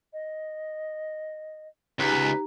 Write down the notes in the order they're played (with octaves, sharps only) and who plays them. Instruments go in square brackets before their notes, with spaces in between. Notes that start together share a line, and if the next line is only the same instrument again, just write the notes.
[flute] D#5
[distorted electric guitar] C#2 [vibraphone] D#4 G4 A#5 [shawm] B4